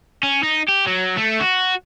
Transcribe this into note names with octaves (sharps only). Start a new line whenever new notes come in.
C#4
D#4
G4
F#3
A3
F#4